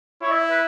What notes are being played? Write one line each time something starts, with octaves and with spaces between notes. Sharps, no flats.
E4 C#5
E5
B4